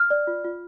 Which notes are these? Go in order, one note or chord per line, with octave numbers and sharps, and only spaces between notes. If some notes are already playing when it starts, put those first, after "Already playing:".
Already playing: F6
D5
F4
F4